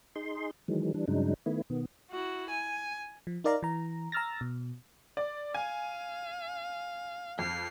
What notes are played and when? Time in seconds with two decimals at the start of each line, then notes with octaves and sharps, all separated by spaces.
0.16 D#4 G#4 C6
0.68 D#3 E3 F#3 G#3
0.94 E3 G3 D4
1.08 G2 C#3 F#3 G#3 D4 D#4
1.46 D#3 A3 B3 E4
1.70 B2 D#3 B3
2.11 E4 F#4
2.51 G#5
3.27 F3
3.44 D#4 A#4 D5 F5 A#5
3.63 E3 A#5
4.12 A#5 E6 F6 A6 A#6
4.41 B2
5.17 D5
5.54 F5 G#5
7.39 F2 F6 C7